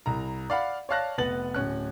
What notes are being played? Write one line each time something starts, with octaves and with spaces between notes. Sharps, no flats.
C2 A#5
D5 F5 F#5 B5
C#5 D5 F5 A5 F#6 A#6
F1 B3 B4 F#5 A6 F#7
D1 C#4 F#6